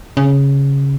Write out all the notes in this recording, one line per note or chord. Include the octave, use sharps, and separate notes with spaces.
C#3